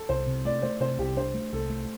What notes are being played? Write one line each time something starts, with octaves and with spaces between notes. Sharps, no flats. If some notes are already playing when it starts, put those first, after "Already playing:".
Already playing: A4
C2 C5
C3
A3 D5
A3 C5
C3 C5
C2 G4
D4 C5
A3
C2 A4
A3